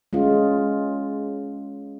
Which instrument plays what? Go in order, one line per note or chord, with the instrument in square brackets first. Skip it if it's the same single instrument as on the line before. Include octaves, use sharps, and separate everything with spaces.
[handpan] G#3 C#4 F4